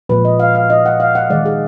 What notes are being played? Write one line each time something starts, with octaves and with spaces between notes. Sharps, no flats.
A#2 F3 G#3 B4
D#5
F5
F5
D#5
F#5
F5
F#5
D#3 G#3 D5
G#4